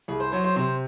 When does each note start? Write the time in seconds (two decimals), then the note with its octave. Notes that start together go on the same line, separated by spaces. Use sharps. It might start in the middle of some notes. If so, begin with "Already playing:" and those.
0.08 C2 G#4
0.20 C5
0.32 F#3 C5
0.44 C5
0.56 C3 C5